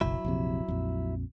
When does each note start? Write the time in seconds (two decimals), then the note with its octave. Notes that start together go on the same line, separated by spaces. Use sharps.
0.01 F#1 B1 F#3 E4
0.25 A#1 F2 C3
0.68 A#1 F2